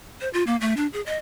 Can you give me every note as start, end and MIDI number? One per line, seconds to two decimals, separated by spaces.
0.21 0.29 72
0.33 0.43 65
0.47 0.56 58
0.61 0.74 57
0.77 0.87 62
0.93 1.01 68
1.06 1.17 75